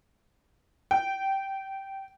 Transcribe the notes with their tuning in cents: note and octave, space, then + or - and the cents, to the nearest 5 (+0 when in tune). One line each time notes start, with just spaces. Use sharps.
G5 -15